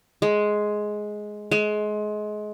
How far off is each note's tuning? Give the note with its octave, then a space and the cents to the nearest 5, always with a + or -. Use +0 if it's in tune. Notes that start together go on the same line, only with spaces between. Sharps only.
G#3 +10
G#3 +25